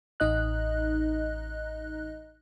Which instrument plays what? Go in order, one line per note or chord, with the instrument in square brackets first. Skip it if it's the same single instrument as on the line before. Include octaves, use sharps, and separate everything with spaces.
[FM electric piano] A1 D#4 D#5 F#6